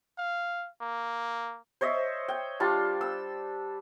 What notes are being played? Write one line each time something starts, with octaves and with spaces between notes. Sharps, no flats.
F5
A#3
C5 C#5 D#5 E5
G5
G3 D4 F4 A5
E6